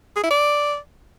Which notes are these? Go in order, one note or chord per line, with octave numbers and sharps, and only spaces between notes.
G#4
E4
D5